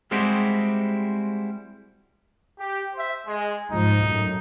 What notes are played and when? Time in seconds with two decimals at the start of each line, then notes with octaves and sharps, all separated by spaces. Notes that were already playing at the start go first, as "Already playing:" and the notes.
0.11 G3 G#3 C4 E4 F#4 G4
2.57 G4
2.94 C5 E5
3.26 G#3
3.70 G#2 F3 D#4
4.03 F#2 A2